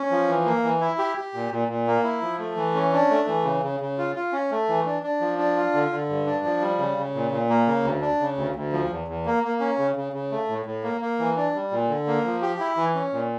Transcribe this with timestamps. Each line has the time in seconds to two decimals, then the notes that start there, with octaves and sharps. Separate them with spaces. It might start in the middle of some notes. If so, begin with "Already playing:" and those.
Already playing: C#4
0.11 F3
0.28 E3
0.46 A#3
0.64 E3
0.80 E4
0.99 G4
1.17 G4
1.34 A#2
1.52 A#2
1.68 A#2
1.87 A#3
2.04 E4
2.22 F3
2.39 A3
2.56 E3
2.75 C#4
2.93 D4
3.10 A3
3.28 E3
3.44 C#3
3.63 C#3
3.80 C#3
3.98 F4
4.16 F4
4.32 C#4
4.51 A3
4.69 E3
4.85 D4
5.03 D4
5.21 F3
5.38 D4
5.57 F4
5.74 D3
5.91 D3
6.09 G2
6.26 D4
6.44 F3
6.61 G3
6.79 C#3
6.97 C#3
7.15 A#2
7.31 A#2
7.49 A#3
7.67 C#3
7.84 D2
8.02 D4
8.20 C#3
8.37 D2
8.56 D2
8.72 F3
8.90 E2
9.08 E2
9.26 A#3
9.44 A#3
9.60 C#4
9.78 C#3
9.96 C#3
10.13 C#3
10.31 A3
10.49 A2
10.66 A2
10.83 A#3
11.01 A#3
11.19 E3
11.37 D4
11.54 G3
11.71 A#2
11.89 D3
12.07 A#3
12.25 F3
12.42 G4
12.60 E4
12.77 E3
12.95 C#4
13.13 A#2